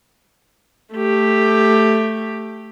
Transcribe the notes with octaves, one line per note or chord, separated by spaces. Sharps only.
A3 G4